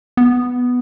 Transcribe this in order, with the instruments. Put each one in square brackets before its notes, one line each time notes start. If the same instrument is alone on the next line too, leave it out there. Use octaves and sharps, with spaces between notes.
[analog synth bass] B3